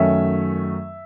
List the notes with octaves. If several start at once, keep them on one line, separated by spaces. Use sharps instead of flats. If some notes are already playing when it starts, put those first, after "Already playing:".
Already playing: F#2 D#3 F#3 A3 C#4 E5